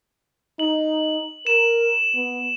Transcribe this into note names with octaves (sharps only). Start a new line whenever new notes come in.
D#4 F#7
A#4 E7
B3